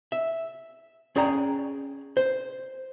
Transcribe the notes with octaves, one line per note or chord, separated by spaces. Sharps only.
E5
C#4 G#4 D5 G5 A#5
C5